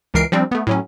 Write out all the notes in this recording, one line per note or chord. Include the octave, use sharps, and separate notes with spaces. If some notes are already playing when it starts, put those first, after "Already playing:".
C#2 E3 A#4 C7 D7
F3 G3 C4 D4
A3 B3
A2 F#3 C#4